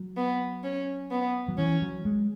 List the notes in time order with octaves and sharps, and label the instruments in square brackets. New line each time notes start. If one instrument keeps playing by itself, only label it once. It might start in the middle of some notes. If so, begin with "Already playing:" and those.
Already playing: [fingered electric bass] F#3
[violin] B3
C#4
B3
[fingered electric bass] F#3
[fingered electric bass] E3 [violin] C#4
[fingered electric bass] F#3
G#3